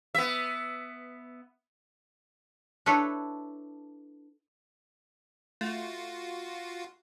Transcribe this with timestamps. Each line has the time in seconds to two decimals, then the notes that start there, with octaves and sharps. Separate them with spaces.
0.15 B3 E5
2.86 D4 E4 A4 B4 C#5
5.61 A3 F4 F#4